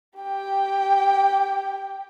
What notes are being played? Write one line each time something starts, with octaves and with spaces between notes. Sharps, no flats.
G4 G5